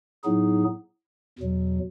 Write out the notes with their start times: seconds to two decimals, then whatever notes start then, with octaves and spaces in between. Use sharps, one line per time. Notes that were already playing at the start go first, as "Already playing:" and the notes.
0.24 A2 F#3 B3 D#4 G#4
1.39 E2 B2 F#3